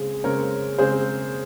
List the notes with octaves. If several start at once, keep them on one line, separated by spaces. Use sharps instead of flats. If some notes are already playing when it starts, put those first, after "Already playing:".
Already playing: C#3 G#3 C4 G#4
C#3 G#3 C4 A#4 C#5
C#3 G#3 C4 G#4 C5